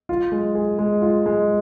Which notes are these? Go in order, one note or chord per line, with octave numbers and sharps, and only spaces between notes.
F4
G#3
G#4
G#3
F4
G#3